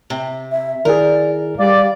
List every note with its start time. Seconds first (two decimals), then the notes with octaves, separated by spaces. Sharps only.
0.10 C3
0.52 E5
0.85 D#3 E4 G#4 A#4 D5
1.58 G3 D5 F5